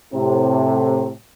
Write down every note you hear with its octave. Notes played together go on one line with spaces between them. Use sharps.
A2 C3